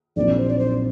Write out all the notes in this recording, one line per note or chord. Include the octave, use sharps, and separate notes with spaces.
A#1 A#2 F#3 C4 D#4 D5
C5
D5
C5